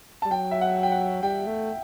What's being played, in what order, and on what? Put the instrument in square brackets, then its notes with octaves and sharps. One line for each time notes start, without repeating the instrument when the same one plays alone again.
[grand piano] A5
[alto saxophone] G3
[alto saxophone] F#3 [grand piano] G5
[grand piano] E5
F#5
G5
F#5
[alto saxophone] G3 [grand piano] G5
[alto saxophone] A3